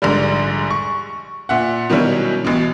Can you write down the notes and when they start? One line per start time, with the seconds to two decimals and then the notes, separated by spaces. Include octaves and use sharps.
0.02 A#1 G#2 D3 G3
0.71 C#6
1.49 A#2 E5 F#5
1.90 B2 D#3 F#3 G3 C#4 E4
2.44 A1 B2